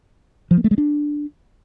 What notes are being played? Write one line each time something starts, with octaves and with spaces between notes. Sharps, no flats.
F3
A#3
A3
G#3
D4